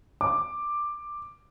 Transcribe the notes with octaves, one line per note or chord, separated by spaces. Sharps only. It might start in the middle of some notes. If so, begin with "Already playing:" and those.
D6